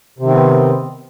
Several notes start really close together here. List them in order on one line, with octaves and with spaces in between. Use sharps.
C3 D#3 C4 B3